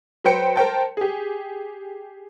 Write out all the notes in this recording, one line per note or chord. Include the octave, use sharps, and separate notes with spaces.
F#3 B4 C5 G5 C#7
A#4 C5 G5 A5
G4 G#4